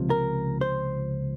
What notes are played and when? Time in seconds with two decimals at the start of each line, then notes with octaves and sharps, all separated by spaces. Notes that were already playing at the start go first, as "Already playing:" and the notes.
Already playing: C#2 C3 F3
0.10 A#4
0.61 C5